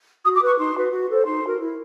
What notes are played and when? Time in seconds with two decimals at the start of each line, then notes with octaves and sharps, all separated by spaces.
0.24 F#4 D#6
0.35 D6
0.41 B4
0.46 C#6
0.58 D#4 C6
0.74 F#4 B4
0.92 F#4
1.09 A4 C5
1.25 D#4 C6
1.42 F#4 A#4
1.60 E4